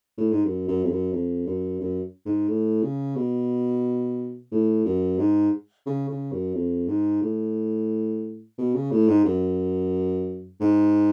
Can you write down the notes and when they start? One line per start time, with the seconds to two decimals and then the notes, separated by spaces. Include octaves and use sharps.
0.18 A2
0.32 G#2
0.45 F#2
0.68 F#2
0.85 F2
0.91 F#2
1.13 F2
1.46 F#2
1.80 F#2
2.26 G#2
2.49 A2
2.82 C#3
3.16 B2
4.51 A2
4.85 F#2
5.19 G#2
5.86 C#3
6.09 C#3
6.32 F#2
6.55 F2
6.88 G#2
7.22 A2
8.58 B2
8.75 C#3
8.91 A2
9.08 G#2
9.25 F#2
10.61 G#2